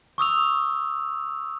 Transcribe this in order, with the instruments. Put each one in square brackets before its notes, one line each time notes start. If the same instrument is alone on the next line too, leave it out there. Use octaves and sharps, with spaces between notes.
[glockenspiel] C#6 D#6 E6 F7